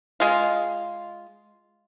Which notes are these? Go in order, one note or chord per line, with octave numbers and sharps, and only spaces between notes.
G#3 F4